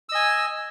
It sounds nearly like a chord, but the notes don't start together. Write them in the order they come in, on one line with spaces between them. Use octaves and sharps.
E6 D#5 G#5